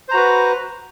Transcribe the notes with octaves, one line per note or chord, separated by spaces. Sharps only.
F#4 B4 C5 A#5